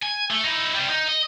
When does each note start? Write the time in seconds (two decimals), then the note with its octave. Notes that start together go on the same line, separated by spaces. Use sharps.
0.02 G#5
0.30 A3
0.44 D#4 E4
0.75 C3 G3
0.90 D#4
1.08 D#5